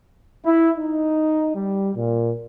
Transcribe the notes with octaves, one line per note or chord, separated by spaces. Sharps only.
E4
D#4
G3
A#2